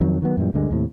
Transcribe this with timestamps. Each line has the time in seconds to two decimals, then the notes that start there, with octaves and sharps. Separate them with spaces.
0.01 F2 D#3 F#3
0.22 D#3 F#3 B3
0.37 F#2 A#2 E3 G3
0.54 D2 G2 D3 G#3
0.71 D#2 A2 C3